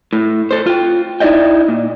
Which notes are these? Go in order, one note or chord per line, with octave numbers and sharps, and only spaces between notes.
A2
A4 C5
F4 G5
D#4 E4 G#4 D5 D#5 G5
A#2